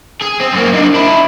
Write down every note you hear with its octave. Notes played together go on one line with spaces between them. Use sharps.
G#4
C4
F#2 A#3
D4 D#4
D4 E4